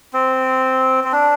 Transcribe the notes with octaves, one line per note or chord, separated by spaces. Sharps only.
C4
C4
D4